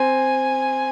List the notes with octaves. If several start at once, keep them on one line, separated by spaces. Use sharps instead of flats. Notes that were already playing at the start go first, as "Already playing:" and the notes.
Already playing: C4 G#5